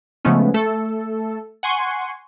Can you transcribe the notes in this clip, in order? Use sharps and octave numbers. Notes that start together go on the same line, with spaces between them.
C#3 F3 G#3 A3 B3 C#4
A3 A4
F#5 G#5 C6 C#6